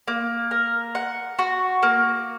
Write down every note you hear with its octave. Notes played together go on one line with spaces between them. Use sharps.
A#3
A#4
F#5
F#4
A#3